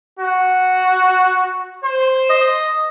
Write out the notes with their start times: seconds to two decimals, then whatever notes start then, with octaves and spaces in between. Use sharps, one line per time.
0.19 F#4
1.84 C5
2.30 D#5